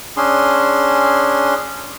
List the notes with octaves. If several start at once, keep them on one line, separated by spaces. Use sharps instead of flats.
C#4 D4 G#4 C6